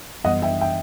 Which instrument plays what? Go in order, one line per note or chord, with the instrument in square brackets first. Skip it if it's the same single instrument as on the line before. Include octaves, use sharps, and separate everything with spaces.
[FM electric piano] F#2 E3 G3 B3 [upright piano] D#5 F#5
[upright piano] E5 G5
E5 G5